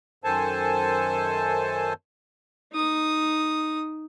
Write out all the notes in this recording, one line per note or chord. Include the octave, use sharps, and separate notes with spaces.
F#2 D#3 A4 C5 G#5 A5
D#4 D#6